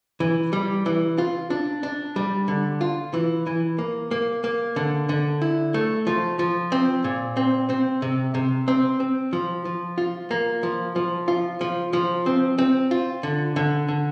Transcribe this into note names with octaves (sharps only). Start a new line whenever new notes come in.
E3
G3
E3
F4
D4
D4
G3
D3
F4
E3
E3
A#3
A#3
A#3
D3
D3
E4
A3
F3
F3
C4
A#2
C4
C4
C3
C3
C4
C4
F3
F3
F4
A#3
F3
F3
F4
F3
F3
C4
C4
F4
D3
D3
D3